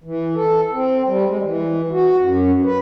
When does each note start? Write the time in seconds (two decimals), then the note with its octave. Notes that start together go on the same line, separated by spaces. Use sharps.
0.04 E3
0.35 A4
0.73 C4
1.06 G3
1.28 G#3
1.43 E3
1.92 F#4
2.19 F#2
2.64 B4